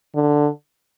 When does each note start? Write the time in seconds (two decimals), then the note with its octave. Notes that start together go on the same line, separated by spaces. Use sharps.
0.15 D3